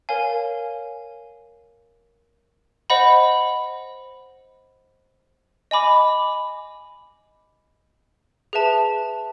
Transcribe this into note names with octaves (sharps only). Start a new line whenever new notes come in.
A#4 C#5 F5 G#5
C5 D#5 F#5 B5
D#5 G#5 B5 D6
G#4 B4 E5 A5